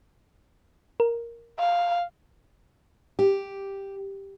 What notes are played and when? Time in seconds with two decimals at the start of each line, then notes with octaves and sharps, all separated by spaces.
1.00 A#4
1.59 F5
3.19 G4